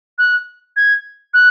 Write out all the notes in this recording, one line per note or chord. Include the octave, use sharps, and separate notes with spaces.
F#6
G#6
F#6